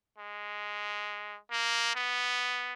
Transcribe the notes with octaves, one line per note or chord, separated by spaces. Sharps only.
G#3
A#3
B3